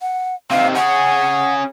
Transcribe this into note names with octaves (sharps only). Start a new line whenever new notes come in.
F#5
C3 D#3 F5
C#4 G#4 F#5